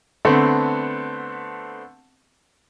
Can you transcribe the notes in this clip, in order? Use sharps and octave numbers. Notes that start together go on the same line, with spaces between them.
D3 A3 B3 C4